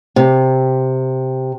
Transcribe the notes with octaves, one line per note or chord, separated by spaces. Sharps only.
C3